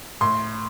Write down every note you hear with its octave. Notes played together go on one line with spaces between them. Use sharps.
A2 C6